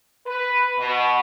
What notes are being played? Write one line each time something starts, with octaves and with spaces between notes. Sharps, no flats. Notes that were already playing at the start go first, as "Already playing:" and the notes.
B4
B2